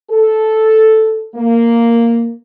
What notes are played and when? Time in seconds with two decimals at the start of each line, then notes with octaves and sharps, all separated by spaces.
0.11 A4
1.36 A#3